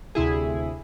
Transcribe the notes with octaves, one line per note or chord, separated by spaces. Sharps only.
D2 C3 E4 G#4